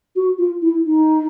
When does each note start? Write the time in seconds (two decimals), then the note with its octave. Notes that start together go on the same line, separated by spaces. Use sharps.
0.16 F#4
0.38 F4
0.62 E4
0.86 D#4